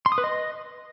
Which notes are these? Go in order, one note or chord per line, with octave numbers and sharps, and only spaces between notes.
C6
D#6
B4
D#5